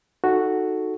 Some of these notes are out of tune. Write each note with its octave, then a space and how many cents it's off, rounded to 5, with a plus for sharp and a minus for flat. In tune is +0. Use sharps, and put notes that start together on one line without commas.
D#4 +0 F#4 +0 A4 +0